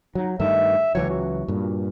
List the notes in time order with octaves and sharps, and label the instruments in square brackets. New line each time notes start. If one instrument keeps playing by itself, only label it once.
[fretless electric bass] F#3 [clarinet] D#4
[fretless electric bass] G2 D#3 A3 [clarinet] E5
[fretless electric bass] C#2 E3 F#3 [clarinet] C#5
[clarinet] F#4
[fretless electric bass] G2 A#2